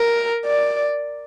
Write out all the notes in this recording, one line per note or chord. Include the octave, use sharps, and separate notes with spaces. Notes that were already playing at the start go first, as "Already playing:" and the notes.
Already playing: A#4
D5